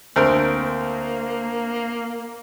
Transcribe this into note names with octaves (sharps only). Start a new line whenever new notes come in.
D2 A#3 C4 A#4